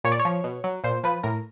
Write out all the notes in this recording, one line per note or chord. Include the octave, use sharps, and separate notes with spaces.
A#2 C#5
D5
C#5
F3
B2
F#3
A#2 C5
F3 B4
A2 A#4